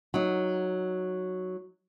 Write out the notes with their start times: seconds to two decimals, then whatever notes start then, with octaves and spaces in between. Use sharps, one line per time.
0.14 F#3 D#4